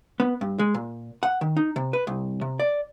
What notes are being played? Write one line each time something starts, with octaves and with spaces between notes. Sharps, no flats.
B3
G2
G#3
A#2
F#5
D#3
D#4
C3
B4
C2
C3
D5